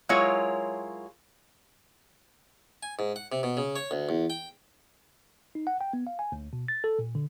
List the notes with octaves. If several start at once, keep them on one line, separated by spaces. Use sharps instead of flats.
F#3 G#3 E4 F4 A#4 C#5
G#5
G#2
F#5
C3
B2
C#3
C#5
D2
E2
G5
D#4
F#5
G5
B3
F5
G#5
D2
B2
A6
A4
A#2
D3